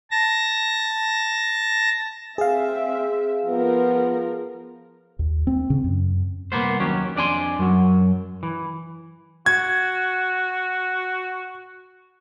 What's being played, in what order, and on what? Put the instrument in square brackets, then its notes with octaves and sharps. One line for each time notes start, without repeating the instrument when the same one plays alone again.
[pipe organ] A5 A#6
[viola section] C4 E5 [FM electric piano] G#4 F5
[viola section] F3 A#4 [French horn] B3
[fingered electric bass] D#2
C4
C#3
F#2
[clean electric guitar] C2 A#3 B3 C5
D#2 F#3 C#4 G4
F2 D4 D5 G#5 C6
F#2 F#3
E3
[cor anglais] F#4 [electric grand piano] G#6